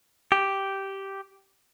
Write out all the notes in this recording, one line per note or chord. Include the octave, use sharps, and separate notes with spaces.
G4